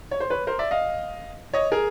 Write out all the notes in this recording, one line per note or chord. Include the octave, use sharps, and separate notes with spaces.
C#5
C5
B4 C#5
A#4 C5
D5 E5
D#5 F5
C#5 D#5
G#4 A#4